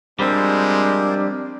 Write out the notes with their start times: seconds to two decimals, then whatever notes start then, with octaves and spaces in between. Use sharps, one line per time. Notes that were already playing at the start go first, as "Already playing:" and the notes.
0.20 F3 G3 G#3 C4 D4 A#4 C5